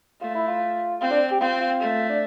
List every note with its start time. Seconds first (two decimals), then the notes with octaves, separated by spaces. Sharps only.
0.21 A3 F4
0.35 E4
0.48 F4
1.01 C4 F4
1.10 D4
1.31 G4
1.40 C4 F4
1.60 F4
1.80 A3
2.09 D4